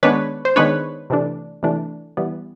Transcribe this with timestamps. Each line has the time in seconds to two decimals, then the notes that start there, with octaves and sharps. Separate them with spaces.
0.03 D#3 G#3 B3 D4 B4 C#5
0.45 C5
0.56 D#3 G#3 B3 D4 B4 C#5
1.10 C3 E3 A3 D4
1.63 C3 E3 A3 D4
2.17 E3 G3 B3